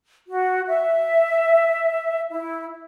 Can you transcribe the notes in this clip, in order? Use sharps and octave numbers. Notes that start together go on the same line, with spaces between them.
F#4
E5
E4